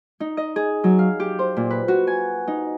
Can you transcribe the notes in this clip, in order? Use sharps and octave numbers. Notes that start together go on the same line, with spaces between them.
D#4
D#5
G#4
F#3
F5
G4
C5
A#2
B4
F#4
G#5
D#4